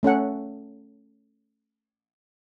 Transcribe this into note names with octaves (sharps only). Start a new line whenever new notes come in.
A3 C#4 A4 F#5